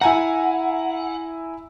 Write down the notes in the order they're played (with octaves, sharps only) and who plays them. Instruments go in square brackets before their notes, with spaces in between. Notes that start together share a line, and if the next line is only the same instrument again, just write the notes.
[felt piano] E4 G#5 A#5 [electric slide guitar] F#5